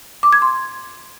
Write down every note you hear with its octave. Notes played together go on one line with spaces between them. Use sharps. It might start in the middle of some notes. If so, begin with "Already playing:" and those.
D6
G#6
C6